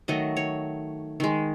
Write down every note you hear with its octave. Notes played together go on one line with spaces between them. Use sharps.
D#3 F#3 A3 D#5
C#5
D#3 G#3